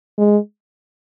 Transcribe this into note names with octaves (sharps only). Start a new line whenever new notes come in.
G#3